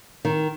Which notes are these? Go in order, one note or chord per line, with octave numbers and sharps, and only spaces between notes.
D#3